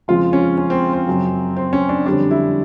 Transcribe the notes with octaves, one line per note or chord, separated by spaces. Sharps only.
F2 C#3 F3 G#3 F4
C#4
C#4
C4
C4
F#2 C#3 F#3
C4
C#4
D4
F2 D3 G3 D4
E4